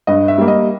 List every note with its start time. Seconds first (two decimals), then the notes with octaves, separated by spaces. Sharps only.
0.07 G2 D#5
0.28 E5
0.38 G3 A#3
0.48 D#5